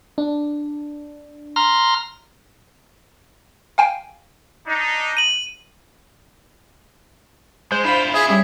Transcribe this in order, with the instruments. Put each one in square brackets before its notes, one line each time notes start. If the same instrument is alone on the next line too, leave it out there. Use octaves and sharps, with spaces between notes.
[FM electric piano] D4
[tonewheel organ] A#5 C6 F6
[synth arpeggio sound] F5 G5 G#5
[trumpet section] D4 D#4
[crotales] D#7 F#7
[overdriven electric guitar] G#3 [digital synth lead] C5
[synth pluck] D4 F5 [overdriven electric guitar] E4 F4 [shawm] B5
[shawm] G#4 [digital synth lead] E5
[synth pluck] G3 C#4 [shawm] G#4